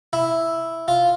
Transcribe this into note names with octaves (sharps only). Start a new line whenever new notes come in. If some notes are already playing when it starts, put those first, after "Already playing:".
E4
F4